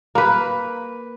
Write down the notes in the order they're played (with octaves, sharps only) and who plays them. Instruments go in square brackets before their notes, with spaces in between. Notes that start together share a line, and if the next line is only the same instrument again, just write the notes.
[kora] A#3 B4